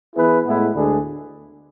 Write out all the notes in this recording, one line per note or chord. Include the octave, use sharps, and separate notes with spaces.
E3 B3 E4 G#4 B4
A2 G#3 B3 E4 B4
D2 D3 G#3 D4 G#4